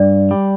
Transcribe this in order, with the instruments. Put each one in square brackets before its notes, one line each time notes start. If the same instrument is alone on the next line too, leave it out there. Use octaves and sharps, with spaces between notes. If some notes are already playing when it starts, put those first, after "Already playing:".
Already playing: [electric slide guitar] G2 [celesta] D5
[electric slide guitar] G3